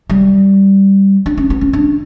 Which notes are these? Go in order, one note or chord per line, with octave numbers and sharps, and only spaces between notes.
G3
D4
C#4
B3
C#4
D4